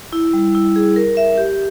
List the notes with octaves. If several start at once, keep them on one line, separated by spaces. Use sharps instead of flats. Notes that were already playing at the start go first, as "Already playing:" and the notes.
E4
G3
E4
G#4
A#4
E5
G4